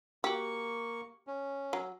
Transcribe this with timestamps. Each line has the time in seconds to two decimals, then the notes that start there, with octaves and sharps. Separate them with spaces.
0.24 A#3 F#4 G4 C#6
1.27 C#4
1.73 F#3